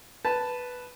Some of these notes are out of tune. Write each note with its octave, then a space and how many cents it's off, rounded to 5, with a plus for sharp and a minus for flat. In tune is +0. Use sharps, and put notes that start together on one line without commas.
B4 +0 A5 +0